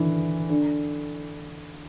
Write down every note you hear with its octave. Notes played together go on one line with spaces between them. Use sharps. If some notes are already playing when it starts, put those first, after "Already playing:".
Already playing: D3 E3
D3